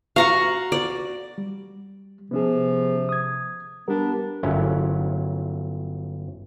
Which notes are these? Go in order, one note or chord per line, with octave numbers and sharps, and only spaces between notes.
F#4 F5 A#5 C#6
D5
G3
C3 F3 B3 C#4 G#4
D#6 G#6
G3 B3 D4 G4 A#4
G1 F#3 C#4 E4